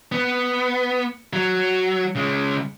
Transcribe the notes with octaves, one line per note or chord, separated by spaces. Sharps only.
B3
F#3
C#3 G#3